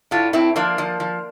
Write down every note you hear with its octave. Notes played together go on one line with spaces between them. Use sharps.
A2 D4 F4
A2 C4 E4
F3 A#3 D4
F3
F3